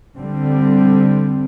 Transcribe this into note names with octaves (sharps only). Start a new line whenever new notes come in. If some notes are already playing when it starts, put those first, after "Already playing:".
D3 G3 C4